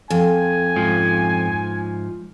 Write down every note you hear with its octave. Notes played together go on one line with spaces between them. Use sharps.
F2 G#5
G#2 F3